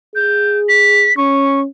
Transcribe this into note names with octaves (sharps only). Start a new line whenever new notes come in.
G#4 G6
B6
C#4 C#6